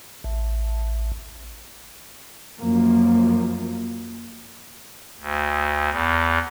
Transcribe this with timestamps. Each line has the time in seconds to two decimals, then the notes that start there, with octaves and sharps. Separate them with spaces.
0.24 A1
2.60 F#2 F3 A#3
5.20 D2
5.91 E2